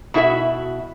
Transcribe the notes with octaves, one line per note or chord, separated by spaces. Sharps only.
B2 E4 F#4 A4 E5